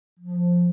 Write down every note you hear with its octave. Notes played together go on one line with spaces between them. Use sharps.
F3